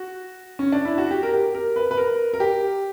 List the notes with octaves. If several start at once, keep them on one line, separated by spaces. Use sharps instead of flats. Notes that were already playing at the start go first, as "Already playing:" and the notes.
Already playing: F#4
C#4
D4
E4
F#4
G4
A#4
G4
A#4
B4
B4
A#4
A#4
G4